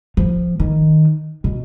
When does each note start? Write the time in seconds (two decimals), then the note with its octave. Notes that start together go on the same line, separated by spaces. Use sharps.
0.17 F3
0.60 D#3
1.44 B2